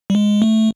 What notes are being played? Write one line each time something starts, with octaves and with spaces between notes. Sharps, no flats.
G3
G#3
A3